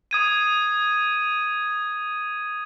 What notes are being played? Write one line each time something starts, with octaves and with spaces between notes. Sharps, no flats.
D#6 G#6 D#7